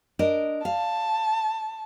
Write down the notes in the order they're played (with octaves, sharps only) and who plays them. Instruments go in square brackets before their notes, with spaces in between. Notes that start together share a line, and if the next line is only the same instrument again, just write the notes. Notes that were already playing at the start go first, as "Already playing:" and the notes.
[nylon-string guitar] D4 A#4 D#5
[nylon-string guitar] F5 [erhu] A5